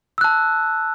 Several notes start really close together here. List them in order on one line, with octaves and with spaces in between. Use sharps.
E6 F#6 A5